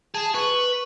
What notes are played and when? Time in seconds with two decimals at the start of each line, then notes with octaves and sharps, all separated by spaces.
0.15 G#4 A5
0.35 B4 C#6